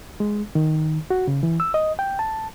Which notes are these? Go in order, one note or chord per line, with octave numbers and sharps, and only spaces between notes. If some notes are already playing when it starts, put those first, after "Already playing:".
G#3
D#3
F#4
C#3
E3
E6
D#5
G5
A5